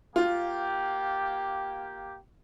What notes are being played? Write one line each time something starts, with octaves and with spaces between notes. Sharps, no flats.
A#3 F4 G4